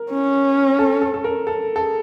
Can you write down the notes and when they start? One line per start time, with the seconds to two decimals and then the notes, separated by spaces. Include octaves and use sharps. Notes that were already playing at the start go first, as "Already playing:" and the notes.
Already playing: A#4
0.11 C#4
0.79 A4
1.01 A4
1.14 A4
1.24 A#4
1.47 A4
1.76 A4
1.81 G#4